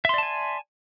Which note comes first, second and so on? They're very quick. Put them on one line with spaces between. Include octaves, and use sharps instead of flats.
E5 C6 D5 A5 G#5